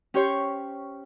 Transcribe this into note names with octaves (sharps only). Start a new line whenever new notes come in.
C#4 G4 C5 C#5